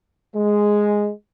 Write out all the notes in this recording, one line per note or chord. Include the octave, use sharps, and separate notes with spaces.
G#3